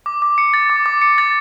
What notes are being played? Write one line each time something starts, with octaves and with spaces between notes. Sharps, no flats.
D6
D6
C#7
A6
D6
D6
C#7
A6